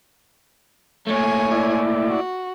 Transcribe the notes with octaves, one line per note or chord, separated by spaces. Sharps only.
A#2 A3 C#5 G#5
E4 D5
F#4